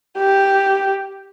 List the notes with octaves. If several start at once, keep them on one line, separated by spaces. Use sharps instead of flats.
G4